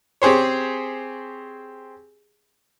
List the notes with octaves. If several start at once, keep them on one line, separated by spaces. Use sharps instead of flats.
C4 G4 G#4 C5 C#5